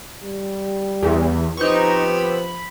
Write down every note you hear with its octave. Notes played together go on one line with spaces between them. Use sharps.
G3
E2
F3 B3 C4 D#4 G4 C#6
B5